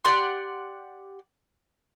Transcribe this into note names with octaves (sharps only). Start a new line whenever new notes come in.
G4 D5 F#5 C6